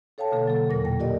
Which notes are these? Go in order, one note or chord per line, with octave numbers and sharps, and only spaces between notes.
A4 C#5 F5 G5 A5
B2 D3 A#3 A4
F#3 A4
E2 A#2 A#4 A#6
F2 A#3 G5
F4 G4 A#4 D5 D#5